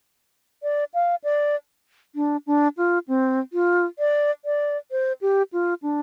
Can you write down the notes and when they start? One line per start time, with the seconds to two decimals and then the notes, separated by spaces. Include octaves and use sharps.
0.63 D5
0.94 F5
1.24 D5
2.15 D4
2.47 D4
2.77 F4
3.08 C4
3.53 F4
3.99 D5
4.45 D5
4.91 C5
5.21 G4
5.53 F4
5.82 D4